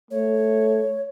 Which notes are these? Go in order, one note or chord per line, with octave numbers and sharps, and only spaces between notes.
A3 C#5